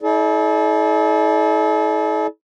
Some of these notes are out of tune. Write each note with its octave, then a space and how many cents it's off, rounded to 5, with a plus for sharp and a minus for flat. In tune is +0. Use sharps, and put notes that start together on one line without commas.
E4 -40 A4 -45 D5 +0